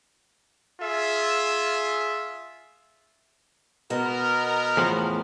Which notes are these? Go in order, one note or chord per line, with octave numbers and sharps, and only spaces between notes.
F4 G#4 E5
B2 B3 F#4 A#4 D#5
E2 A2 F3